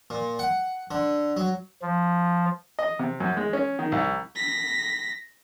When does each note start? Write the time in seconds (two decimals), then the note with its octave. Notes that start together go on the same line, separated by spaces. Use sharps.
0.10 A#2
0.39 F#5
0.91 D3
1.37 F#3
1.82 F3
2.79 D#5
2.99 C3
3.20 F#2
3.37 G#3
3.53 C#4
3.79 D#3
3.92 C2
4.36 A#6 B6